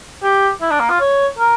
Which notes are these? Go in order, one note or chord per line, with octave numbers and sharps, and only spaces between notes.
G4
E4
D4
A#3
F4
C#5
A#4